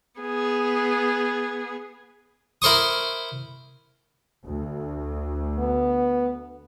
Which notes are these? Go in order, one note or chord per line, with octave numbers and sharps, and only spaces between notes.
B3 G#4
E4 A#4 C5 C#6 D#6
D2
B3